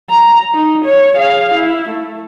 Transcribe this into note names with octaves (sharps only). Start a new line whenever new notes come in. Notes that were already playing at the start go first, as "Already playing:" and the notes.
A#5
D#4
C#5
G#4 F5
E4
A3